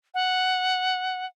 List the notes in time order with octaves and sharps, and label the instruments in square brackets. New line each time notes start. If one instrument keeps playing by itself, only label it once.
[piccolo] F#5